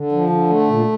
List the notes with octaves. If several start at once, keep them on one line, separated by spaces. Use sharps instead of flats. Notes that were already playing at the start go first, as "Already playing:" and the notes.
Already playing: D3
F3
D3
A3
A#2